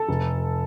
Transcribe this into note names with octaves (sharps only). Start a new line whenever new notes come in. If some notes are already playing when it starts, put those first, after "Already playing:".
Already playing: A4
F1